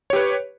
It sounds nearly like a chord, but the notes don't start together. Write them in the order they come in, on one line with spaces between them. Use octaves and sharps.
C#5 G4 B4